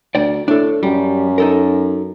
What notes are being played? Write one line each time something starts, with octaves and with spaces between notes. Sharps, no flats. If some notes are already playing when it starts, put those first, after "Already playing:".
D2 D5 G5
A2 D4 A4
F#2 G3
D#4 A4 A#4